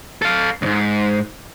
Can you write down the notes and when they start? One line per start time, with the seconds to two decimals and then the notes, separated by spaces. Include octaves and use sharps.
0.22 A4 F5
0.62 D2 G#2